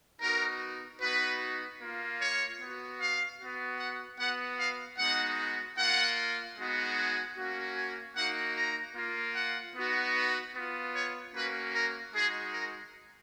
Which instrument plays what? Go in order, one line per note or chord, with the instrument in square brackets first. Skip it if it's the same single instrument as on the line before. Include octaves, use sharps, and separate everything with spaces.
[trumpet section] B3 D#4 F#4 A#4
B3 D#4 F#4 B4
A#3 F4
C#5
B3 F#4
F5
B3 F#4
F#5
B3 F#4 F#5
F5
G#3 B3 D#4 F#4 F#5
A#3 F4 F#5
G#3 B3 D#4 F#4
G#5
A#3 C#4 F#4
G#5
A#3 D#4 F#4 F#5
A#5
A#3 F4
F#5
B3 D#4 F#4
B4
B3 F4
C#5
A#3 C#4 F#4 B4
A#4
G#3 D#4 F#4 G#4
A#4